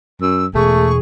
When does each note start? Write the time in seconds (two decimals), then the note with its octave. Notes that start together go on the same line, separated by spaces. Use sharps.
0.21 F#2 E6
0.55 E1 A3 G#4 C#6